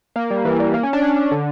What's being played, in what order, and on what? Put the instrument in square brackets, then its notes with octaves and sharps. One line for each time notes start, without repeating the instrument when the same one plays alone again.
[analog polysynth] A#3
G3
E3
G3
A#3
C#4
D4
C#4
D3